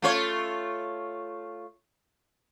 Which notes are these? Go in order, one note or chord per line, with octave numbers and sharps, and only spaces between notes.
A3 F4 C#5